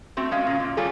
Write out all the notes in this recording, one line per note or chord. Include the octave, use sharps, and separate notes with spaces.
A3 C4 F#4
G#3 C#4 F5
A#2 C#3
A#2
G3 F4 G#4 A4 C#5